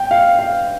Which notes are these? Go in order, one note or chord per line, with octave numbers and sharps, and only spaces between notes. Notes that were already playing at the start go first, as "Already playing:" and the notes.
Already playing: G5
F5
F5